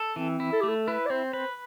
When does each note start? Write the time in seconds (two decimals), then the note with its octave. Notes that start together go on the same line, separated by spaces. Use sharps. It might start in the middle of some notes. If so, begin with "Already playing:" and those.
Already playing: A4
0.16 E3 C4
0.40 E4
0.52 A4
0.61 A3 G4
0.69 A4
0.87 E4 B4
1.06 D5
1.10 C4 C5
1.33 B4 C5